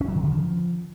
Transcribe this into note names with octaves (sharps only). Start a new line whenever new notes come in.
C#4
F#3
D#3
D3
F3